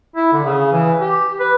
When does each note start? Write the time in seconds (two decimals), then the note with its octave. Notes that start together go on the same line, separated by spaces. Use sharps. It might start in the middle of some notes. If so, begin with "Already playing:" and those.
0.16 E4
0.33 D3
0.44 C#3
0.72 E3
1.00 G4
1.40 B4